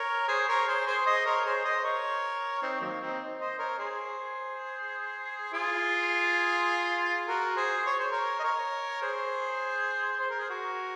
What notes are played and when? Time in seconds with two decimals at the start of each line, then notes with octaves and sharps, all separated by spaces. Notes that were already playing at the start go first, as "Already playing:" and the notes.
Already playing: A#4 C#5
0.28 G#4 C5
0.48 A#4 C#5
0.67 G#4 C5
0.87 G#4 C5
1.06 C5 D#5
1.25 A#4 C#5
1.45 G#4 C5
1.64 C5 D#5
1.83 A#4 C#5
2.62 C4 D#4
2.81 D#3 F#3 A#3
3.00 C4 D#4
3.39 C5 D#5
3.58 A#4 C#5
3.78 G#4 C5
5.53 F4 G#4
7.27 F#4 A#4
7.56 G#4 C5
7.86 C#5
8.00 C5
8.11 A#4 C#5
8.39 D#5
8.44 A#4 C#5
9.02 G#4 C5
10.19 C5
10.30 A#4
10.38 G#4
10.49 F#4 A#4